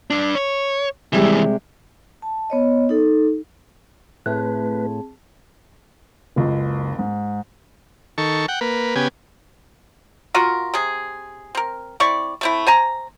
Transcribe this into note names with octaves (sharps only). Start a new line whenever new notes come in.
G2 D4
C#5
D#2 C3 E3 G3 G#3
A5
B3 C#5 D#5
D#4 A4
A2 A3 C4 G#4 B4 A5
F#1 C#2
G#2
D#3 A4 C#6
F#5 G5
A#3 B4
C#3 B3 G4 G#5
F4 F#4 A#4
C3 G#4
C4 A#4
C4 E4 D5 C#6
A3 C4 E4
C5 G#5 A#5